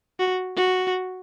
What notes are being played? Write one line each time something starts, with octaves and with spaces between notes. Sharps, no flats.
F#4
F#4